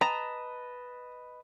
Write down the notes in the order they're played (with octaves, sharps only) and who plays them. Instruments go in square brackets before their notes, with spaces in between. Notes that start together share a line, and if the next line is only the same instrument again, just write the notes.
[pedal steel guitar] B4 D#5 A5 [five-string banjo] A#5